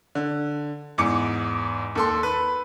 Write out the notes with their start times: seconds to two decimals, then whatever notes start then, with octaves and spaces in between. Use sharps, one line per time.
0.15 D3
0.98 E2 G#2 D6 C#7
1.95 D#2 A4 C6
2.23 B4